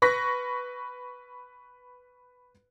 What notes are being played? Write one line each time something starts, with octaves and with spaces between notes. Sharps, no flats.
B4 C#6 F#6 A#6 B6